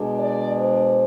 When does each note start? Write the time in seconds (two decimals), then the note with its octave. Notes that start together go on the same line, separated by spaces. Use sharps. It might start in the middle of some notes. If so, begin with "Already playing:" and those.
Already playing: B2 G#3 D4
0.19 D5
0.59 C5